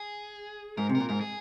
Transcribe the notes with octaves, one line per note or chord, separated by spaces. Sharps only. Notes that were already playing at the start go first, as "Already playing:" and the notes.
Already playing: G#4
G#2 A#4
C3
A#4
A#2
G#2 A#4
G#4